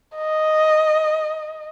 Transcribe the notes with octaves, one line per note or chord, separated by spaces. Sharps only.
D#5